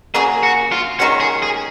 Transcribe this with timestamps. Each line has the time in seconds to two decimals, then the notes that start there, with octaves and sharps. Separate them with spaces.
0.14 C#3 F#3 A#3 G#4
0.43 F#4
0.72 F4
0.99 D#3 G#3 C#4 F#4
1.20 G#4
1.43 G#4